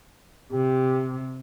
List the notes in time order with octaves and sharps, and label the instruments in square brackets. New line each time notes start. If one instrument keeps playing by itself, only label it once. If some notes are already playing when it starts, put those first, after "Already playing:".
[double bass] C3 [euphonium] G4